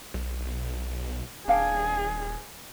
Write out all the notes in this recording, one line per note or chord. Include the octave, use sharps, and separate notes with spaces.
B1
D#1 D4 G#4 F5 G5